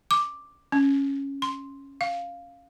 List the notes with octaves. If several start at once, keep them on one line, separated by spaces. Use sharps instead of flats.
D6
C#4
C6
F5